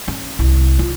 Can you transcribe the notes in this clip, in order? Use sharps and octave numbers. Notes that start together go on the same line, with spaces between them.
C#4
C2
F4